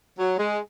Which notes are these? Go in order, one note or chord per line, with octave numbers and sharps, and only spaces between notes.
F#3
G#3